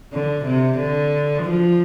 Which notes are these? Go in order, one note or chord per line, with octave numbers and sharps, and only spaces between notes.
D3
C3
D3
F3